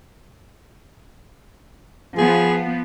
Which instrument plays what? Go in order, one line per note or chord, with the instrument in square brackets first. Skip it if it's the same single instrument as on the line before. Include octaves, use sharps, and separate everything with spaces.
[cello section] F3 B3 [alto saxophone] G#4